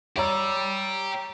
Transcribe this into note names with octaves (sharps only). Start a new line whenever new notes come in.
G4 C#5 D5 A#5 E6